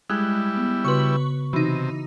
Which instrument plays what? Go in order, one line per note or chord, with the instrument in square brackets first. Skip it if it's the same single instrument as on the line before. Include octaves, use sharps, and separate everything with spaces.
[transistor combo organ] G3 E4 [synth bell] G#3 F#6
[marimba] B3
[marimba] C#3 F#4 C6 [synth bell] B4 C#6
[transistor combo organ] C3 [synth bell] E3 D#4 [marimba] F#4